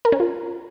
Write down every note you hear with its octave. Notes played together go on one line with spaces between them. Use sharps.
A#4
C#4
F4